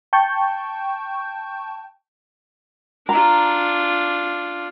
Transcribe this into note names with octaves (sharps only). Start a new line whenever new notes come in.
G5 A5 C#6 G6
D4 F4 A#5